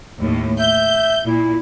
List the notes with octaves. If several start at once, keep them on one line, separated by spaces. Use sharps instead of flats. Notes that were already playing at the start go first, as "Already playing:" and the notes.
D#2 A2
E5 G6
A#2 E4